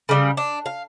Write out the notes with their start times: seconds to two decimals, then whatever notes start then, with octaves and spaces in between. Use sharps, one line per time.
0.09 C#3 G3
0.37 D4
0.66 F5